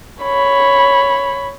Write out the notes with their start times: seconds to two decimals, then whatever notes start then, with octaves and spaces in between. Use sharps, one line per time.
0.22 C#5 B5